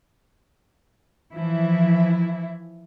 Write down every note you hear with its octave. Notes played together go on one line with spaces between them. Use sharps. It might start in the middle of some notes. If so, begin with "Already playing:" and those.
E3 F3 E4